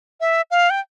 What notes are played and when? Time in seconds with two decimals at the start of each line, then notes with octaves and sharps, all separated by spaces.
0.21 E5
0.51 F5
0.70 G5